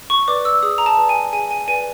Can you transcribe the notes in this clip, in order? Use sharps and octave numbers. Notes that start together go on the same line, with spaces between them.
C#6
B4 D5 D6
E6
G#4 D#6
A#5
A5
B4 D5
G#5
G#4 G#5
G#5
B4 D5 G#5